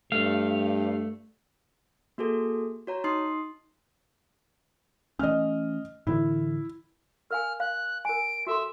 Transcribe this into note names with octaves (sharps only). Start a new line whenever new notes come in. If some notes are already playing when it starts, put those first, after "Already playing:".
G2 A3 F5
A#3 F#4 G#4 A4
F#4 C#5 A#5
D#4 C6 D#6 C7
E3 A3 C#4 D#5 F6
A2 D3 E3 E4
A#4 F5 G#5 F6
F5 F#6
A#4 G#5 D7
F#4 A4 E5 C6